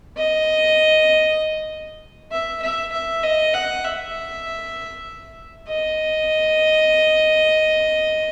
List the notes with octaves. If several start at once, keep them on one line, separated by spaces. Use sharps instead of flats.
D#5
E5
E5
E5
D#5
F#5
E5
D#5